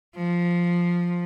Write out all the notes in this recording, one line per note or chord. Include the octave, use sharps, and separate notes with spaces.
F3